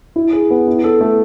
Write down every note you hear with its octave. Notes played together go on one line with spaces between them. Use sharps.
E4
G#4
B3
E4
A4
A3